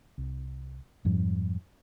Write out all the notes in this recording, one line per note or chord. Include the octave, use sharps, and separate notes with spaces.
C2
F2 G#2 F3 G3